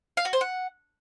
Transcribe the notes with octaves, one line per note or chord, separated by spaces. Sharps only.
F5
F#4
C5
F#5